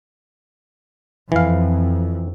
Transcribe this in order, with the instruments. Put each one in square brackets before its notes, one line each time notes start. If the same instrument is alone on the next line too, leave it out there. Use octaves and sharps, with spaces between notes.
[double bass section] F2 [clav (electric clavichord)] E3 F5